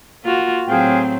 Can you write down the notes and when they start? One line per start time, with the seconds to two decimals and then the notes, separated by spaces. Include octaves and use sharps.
0.23 A#3 F4 F#4
0.68 A2 F#3 C4 G#4 F5 G5